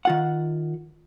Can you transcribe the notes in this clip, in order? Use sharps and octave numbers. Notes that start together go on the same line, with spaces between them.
D#3 F4 F#5